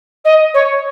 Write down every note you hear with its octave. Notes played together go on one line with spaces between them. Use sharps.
D#5
C#5